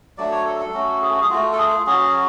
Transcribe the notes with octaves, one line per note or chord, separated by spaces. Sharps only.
F#3 A3 D4 D5
C#5
A4
A4
F#3 A3 C#4 F#4
G#4
F#4
G#4
A3 F4 F#4
A4
G#4
F#3 C#4 F#4 G#4